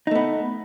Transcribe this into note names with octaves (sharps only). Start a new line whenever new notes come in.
A3 B3 D#4